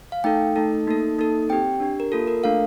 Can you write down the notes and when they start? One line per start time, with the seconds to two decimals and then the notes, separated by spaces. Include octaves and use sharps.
0.12 F5
0.24 A3 D#4 A4 G5
0.56 A3 D#4 A4
0.87 A#3 D#4 A4
1.18 A#3 D#4 A4
1.49 C4 G4 G5
1.80 D4 G4
2.00 A#4
2.12 A#3 F4 A4
2.27 A#4
2.43 A3 D4 A4 F5